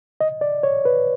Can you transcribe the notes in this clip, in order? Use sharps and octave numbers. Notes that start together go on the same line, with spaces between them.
D#5
D5
C#5
B4